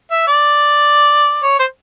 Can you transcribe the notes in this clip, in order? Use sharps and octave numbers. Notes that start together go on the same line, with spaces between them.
E5
D5
C#5
C5